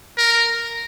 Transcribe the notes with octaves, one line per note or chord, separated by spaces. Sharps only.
A#4